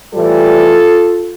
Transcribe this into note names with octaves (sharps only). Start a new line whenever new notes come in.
A2 E3 G3 F4 A4